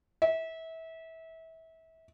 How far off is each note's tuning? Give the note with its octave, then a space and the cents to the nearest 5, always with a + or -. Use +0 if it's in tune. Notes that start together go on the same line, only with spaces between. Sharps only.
E5 -25